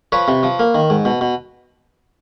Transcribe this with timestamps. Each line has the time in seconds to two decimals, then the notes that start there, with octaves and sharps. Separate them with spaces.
0.12 F3 B4 C#5
0.28 C3
0.43 F3
0.59 A#3
0.75 D#3
0.90 G#2
1.05 B2
1.21 B2